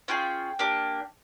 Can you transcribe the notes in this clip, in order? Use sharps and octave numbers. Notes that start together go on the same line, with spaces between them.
C#4 F4 G#4 G5
A#3 D4 G4